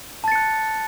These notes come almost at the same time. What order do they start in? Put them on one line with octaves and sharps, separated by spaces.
A5 A6 C#7 F#6